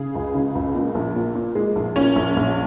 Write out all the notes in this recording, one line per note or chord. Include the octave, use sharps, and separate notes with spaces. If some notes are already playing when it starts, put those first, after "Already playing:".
Already playing: C#3 G#4
C#2
C#3
C#2
A#2
A#1
A#2
A#2
G#3
A#1
A#2 C#4
A#1
A#1